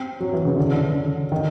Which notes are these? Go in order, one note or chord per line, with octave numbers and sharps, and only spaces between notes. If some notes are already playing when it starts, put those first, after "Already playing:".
Already playing: C4
F#3
E3
C#3
D3
C#3
D3
D#3